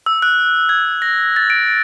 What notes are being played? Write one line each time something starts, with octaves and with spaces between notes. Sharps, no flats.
E6
F#6
G#6
A#6
A6
D7